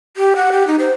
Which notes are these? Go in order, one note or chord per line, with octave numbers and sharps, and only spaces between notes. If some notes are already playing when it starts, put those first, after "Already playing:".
G4
F#5
G4
D#4
C5